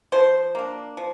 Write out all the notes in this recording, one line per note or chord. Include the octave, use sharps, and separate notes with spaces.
F3 C5
A#3 D4
F3